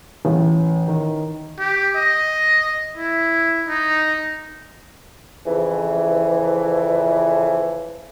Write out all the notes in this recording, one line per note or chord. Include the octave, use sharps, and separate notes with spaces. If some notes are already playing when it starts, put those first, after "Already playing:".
A1
D#3
G4
D#5
E4
D#4
F2 C#3 E3